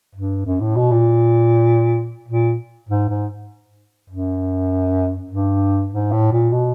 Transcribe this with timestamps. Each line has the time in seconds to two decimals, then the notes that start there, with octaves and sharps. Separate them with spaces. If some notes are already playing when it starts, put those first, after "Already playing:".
0.15 G2
0.46 F#2
0.61 A2
0.76 B2
0.91 A#2
2.28 A#2
2.89 G#2
3.09 G#2
4.10 F#2
5.31 G2
5.92 G#2
6.12 A2
6.32 A#2
6.52 B2